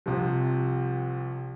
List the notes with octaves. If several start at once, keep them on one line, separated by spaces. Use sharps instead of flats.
C2 C3 F3